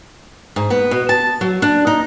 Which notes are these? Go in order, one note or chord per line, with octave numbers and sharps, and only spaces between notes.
G#2
B3
B2
A5
F#3
D4
D#4